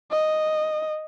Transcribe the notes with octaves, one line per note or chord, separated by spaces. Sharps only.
D#5